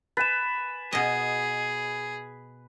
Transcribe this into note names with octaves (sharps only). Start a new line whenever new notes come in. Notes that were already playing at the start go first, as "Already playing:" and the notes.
B4 G#5 A6 E7
B2 G#4 D#5